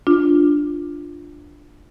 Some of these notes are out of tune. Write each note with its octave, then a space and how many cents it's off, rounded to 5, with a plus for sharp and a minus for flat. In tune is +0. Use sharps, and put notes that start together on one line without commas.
D4 +0 F4 +0